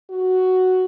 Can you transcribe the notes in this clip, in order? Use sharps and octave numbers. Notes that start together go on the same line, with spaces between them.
F#4